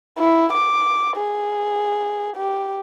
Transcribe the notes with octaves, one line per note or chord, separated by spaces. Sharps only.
E4
D6
G#4
G4